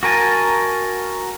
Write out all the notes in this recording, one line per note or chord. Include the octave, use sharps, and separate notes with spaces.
F#4 A#4 G#5 A5